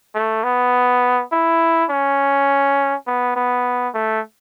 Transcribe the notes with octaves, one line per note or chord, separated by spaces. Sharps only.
A3
B3
E4
C#4
B3
B3
A3